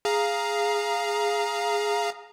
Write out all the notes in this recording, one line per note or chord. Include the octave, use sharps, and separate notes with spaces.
G#4 F5 A#5